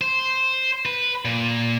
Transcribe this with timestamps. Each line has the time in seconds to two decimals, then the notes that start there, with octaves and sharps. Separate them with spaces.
0.01 C5
0.86 B4
1.25 A#2